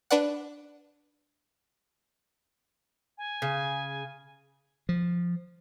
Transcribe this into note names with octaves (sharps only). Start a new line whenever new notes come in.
D4 B4 D5 F#5
G#5
C#3
F3